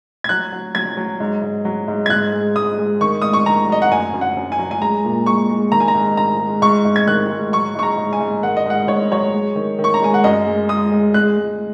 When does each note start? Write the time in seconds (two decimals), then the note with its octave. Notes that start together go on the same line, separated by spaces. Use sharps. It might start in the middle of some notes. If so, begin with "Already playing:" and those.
0.24 G#6
0.29 F#3 F#6
0.52 F#3
0.75 F#3 G#6
0.97 F#3
1.20 G#2
1.43 G#2
1.65 F#3
1.88 G#2
2.06 G#6
2.10 G#2 F#6
2.33 G#3
2.55 G#2 D#6
2.78 G#3
3.01 D#3 C#6
3.22 G#2 D#6
3.33 C#6
3.46 D#3 A#5
3.69 F#3 D#5
3.82 F#5
3.92 F#2 G#5
4.14 F#2
4.21 F#5
4.37 F#2
4.52 G#5
4.59 F#3
4.71 G#5
4.81 G#3 A#5
5.05 A#2
5.26 G#3 C#6
5.50 G#3
5.72 D#3 A#5
5.80 G#5
5.88 A#5
5.95 G#2
6.17 D#3 A#5
6.39 G#3
6.62 G#2 C#6
6.85 G#2
6.96 G#6
7.07 D#3 F#6
7.30 G#2
7.53 F#3 C#6
7.75 G#2 C#6
7.83 A#5
7.98 G#2
8.13 G#5
8.20 G#2
8.43 D#3 F#5
8.57 D#5
8.66 G#2 F#5
8.88 G#2 C#5
9.11 F#3 C#5
9.34 G#3
9.56 D#3
9.79 D#3
9.84 C#6
9.94 A#5
10.02 G#3 G#5
10.14 F#5
10.24 F#2 D#5
10.47 G#3
10.69 G#3 D#6
10.92 G#3
11.14 G#3 F#6
11.37 G#3